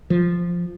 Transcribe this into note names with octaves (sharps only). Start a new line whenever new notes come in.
F3